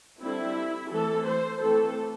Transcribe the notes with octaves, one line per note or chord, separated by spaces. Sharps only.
D3 G3 C4 E4
E3 A3 C4 A4
C5
E3 A3 C4 A4